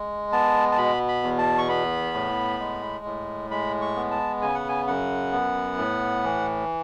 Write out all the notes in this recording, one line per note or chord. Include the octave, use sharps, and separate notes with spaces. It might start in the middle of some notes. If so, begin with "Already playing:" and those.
Already playing: G#3
B3 A5
A5
B2 B5
B5
E2
A5
C#6
B3 B5
A2
G#3
A2
G#3 B5
C#6
B3
A5
C#3 G#5
F#5
G#5
F#2 F#5
B3
A2
E3